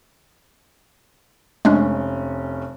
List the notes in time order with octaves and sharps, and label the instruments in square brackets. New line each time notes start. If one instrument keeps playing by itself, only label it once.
[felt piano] F1 C#4 [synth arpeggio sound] G#3 A3 D4